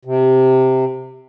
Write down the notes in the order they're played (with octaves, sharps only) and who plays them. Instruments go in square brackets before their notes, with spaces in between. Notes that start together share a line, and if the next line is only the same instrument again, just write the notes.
[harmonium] C3